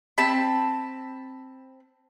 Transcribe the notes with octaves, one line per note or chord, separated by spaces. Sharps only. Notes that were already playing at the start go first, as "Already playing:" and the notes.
C4 A5 B5